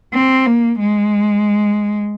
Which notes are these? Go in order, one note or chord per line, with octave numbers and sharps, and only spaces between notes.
C4
A#3
G#3